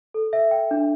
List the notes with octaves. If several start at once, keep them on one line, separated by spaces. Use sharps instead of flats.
A4
E5
G5
D4